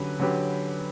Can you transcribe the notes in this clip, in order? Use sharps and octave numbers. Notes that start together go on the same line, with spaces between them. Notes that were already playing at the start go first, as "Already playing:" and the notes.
Already playing: D3 F#3 C#4 G4 B4
D3 F#3 C#4 G4 B4